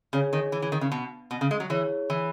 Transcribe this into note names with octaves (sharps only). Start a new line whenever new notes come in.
C#3 G#4 C#5 G#5
D#3
E3
E3
D#3
C#3
B2
B2
C#3
G#3
F#3
E3 E4 G#4 C#5
E3